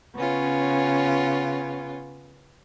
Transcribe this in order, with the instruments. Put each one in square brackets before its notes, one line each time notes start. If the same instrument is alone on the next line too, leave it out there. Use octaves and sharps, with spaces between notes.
[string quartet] C#3 B3 C#4 F4